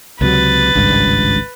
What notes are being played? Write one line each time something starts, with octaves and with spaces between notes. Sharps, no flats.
C#2 C3 F#3 B4 A6
G#1 C#2 G2